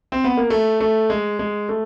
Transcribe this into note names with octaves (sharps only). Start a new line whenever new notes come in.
C4
B3
A#3
A3
A3
G#3
G#3
A3